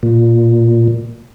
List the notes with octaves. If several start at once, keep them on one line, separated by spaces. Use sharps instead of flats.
A#2